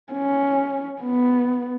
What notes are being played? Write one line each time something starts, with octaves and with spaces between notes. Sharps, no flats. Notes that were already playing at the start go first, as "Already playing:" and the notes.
C#4
B3